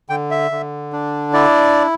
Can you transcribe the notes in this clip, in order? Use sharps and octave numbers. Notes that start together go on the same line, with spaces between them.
D3 G5
E5
D3
D4
E4 D5